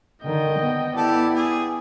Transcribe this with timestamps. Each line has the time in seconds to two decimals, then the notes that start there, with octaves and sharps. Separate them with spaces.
0.23 D3 D#3 D#5 G5
0.60 B3
0.96 E4 G4 A4 D5
1.36 G#4